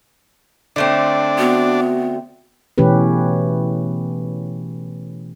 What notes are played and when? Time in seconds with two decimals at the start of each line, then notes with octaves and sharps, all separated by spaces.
0.76 D3 A3 C4 D4
1.38 B3 F#4
2.78 B2 E3 A3 C#4 G4 B4